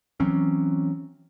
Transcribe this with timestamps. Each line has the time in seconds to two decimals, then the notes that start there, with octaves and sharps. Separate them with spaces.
0.20 E3 F#3 C4 C#4